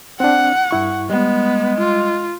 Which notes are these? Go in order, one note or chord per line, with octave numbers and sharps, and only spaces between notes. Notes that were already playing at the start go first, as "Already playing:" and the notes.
C4 D4 F#5
G2 E4 C#6
G3 G#3 B3
F4